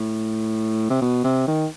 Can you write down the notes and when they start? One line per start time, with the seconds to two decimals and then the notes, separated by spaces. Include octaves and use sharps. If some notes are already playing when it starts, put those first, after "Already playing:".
Already playing: A2
0.90 C3
1.02 B2
1.24 C3
1.48 D#3